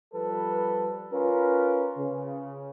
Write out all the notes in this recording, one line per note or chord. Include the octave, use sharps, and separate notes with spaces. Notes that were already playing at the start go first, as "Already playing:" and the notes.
F3 G3 A4 B4
C#4 F4 A#4 B4
C#3